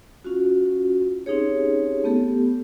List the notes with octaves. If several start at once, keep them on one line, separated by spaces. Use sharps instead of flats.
C#4 F4 F#4
C4 C#4 D#4 G4 G#4 C#5
A3 B3 G4 A4